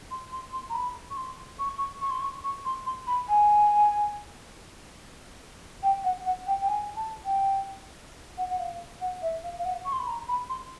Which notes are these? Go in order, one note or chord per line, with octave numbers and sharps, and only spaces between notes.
C6
C6
C6
A#5
B5
C#6
C6
C#6
C#6
C#6
C6
C#6
C#6
C6
C6
B5
G#5
G5
F#5
F#5
G5
G5
G#5
A5
G5
F#5
F#5
F5
F#5
E5
F5
F5
F#5
C#6
C6
B5
A#5
B5
C6